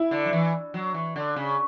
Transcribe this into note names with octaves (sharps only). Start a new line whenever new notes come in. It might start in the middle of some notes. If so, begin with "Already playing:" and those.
Already playing: E4
D3
F#3
E3
F#3
E3
D3
C#3